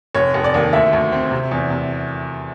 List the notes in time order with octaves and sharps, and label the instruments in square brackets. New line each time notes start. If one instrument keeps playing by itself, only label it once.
[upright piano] F1 C#5
F1
D5
D#2
D2 E5
D2
C4
C3
E2
C3